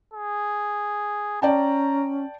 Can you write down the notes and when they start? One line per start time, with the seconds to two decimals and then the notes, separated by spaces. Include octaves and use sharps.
0.13 G#4
1.42 C#4 D5 G5 A5 A#5